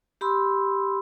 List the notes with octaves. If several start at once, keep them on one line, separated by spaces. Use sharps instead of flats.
G4 B5 C6 E6